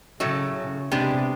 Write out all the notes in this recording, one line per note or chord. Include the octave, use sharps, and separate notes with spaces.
A2 C#3 F#3 A3
C3 G#3 B3 D4 G4